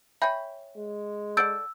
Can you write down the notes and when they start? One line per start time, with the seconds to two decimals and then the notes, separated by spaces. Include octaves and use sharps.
0.22 C#5 E5 G5 G#5 B5 G6
0.76 G#3
1.37 A4 D5 F#5 E6 G6 A6 D7